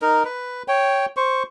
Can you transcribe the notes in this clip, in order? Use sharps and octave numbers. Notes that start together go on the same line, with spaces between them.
D#4 A#4
B4
C#5 G5
C5 C#6